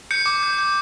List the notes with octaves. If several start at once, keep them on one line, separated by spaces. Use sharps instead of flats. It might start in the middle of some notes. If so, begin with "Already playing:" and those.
G6 C#7
D6
G6
G6